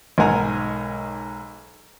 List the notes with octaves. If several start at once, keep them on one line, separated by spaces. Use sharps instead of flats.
B1 G#2 A#4 F#5 G#5 A#5